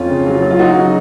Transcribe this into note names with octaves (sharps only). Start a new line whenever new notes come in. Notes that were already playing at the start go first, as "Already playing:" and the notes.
Already playing: F2 C#4 F4
C#3
F#3
F#3
F4
F#3 D#4 F#4
C#3